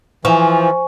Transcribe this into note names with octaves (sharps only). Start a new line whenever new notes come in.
E3 F3 G#5 C#6